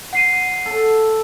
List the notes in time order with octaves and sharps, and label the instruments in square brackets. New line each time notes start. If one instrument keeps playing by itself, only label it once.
[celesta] F#5 C7 D#7
[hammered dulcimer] A4